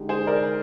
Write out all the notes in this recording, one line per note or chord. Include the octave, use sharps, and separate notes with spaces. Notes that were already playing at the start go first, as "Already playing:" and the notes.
Already playing: D3 G#3 D#4 G4
G#4 C5
A#4 D5